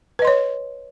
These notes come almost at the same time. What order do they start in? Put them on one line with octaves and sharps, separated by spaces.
B4 D#5 C6 C#5